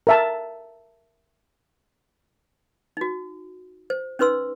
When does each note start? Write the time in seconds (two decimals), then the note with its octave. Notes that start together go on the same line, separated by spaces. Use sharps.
0.07 A#4 E5 A5
2.97 D#4 F#4
3.90 C5
4.19 C#4 D#4 B4 C6 E6